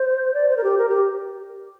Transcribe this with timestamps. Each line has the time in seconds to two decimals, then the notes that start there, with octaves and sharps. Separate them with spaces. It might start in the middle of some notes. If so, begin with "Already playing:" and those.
Already playing: C5
0.34 D5
0.49 C5
0.57 A#4
0.63 G4
0.78 A#4
0.89 G4